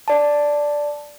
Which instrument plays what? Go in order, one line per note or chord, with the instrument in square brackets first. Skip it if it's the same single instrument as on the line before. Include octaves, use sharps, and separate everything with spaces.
[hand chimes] D5 A5